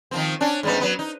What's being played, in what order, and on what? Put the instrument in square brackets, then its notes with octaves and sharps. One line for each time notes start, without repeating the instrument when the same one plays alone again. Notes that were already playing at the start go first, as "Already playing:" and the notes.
[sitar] D#3 F3 C4
C#4 D4
G#2 G3 B3
F#3 B3
D#4